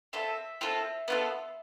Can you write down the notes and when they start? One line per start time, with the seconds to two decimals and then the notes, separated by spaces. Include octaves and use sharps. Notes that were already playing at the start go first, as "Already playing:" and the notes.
0.13 C4 F4 A4 E5
0.61 C4 F4 A4
1.08 B3 F4 A4